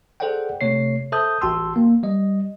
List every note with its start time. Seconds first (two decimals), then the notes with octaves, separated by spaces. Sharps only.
0.20 G#4 A4 C5 D5 F#5 G5
0.61 C3 A3 C#5 C7
1.12 A4 C5 E5 A5 D#6 G6
1.41 A1 F#4 G5 A5 C6 E6
1.76 A#3
2.03 G3 D#5